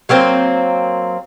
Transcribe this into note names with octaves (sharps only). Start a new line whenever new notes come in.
F#3 A#3 C4 C5